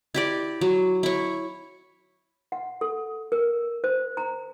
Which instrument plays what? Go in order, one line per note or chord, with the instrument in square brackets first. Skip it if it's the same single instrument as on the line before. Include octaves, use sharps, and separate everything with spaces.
[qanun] E4 G4 D5
F#3
E4 C#5
[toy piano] F#5
A4
A#4
C5
A#5